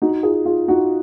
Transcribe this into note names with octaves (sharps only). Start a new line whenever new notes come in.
D#4 F#4
F4 G#4
F4 G#4
D#4 F#4